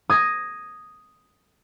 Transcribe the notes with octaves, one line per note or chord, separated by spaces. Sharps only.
D#6 G#6 A#6